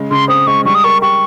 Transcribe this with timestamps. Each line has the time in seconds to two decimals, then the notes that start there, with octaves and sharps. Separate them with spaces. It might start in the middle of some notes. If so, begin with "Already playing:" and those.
Already playing: C#3 G#3
0.11 C#3 C6
0.28 C4 D#6
0.47 G#3 C#6
0.65 G3 C#6
0.75 D#6
0.84 A#4 C#6
1.02 G4 C#6